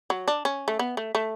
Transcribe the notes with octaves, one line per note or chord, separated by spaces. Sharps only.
F#3
D4
C#4
A3
B3
A3
A3